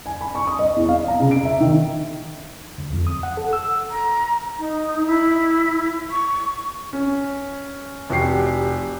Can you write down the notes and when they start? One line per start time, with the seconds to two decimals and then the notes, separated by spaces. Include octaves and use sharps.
0.06 G#5
0.21 B5
0.35 C#6
0.47 D#6
0.59 D#5
0.76 E2
0.89 F5
1.08 A#5
1.20 C#3
1.31 D7
1.45 E5
1.60 D#3
2.78 D2
2.93 F2
3.07 D#6
3.23 F#5
3.37 A4
3.53 E6
3.90 A#5
4.59 D#4
5.06 E4
6.11 C#6
6.93 C#4
8.09 F1 F#4 G4 C7